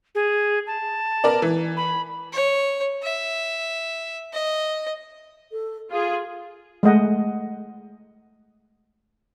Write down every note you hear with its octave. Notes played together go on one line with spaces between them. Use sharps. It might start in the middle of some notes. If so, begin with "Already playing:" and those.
G#4
A5
B3 A#4 D5
E3
B5
C#5
E5
D#5
A4
F4 G#4 F5
G#3 A3 D#5 F#5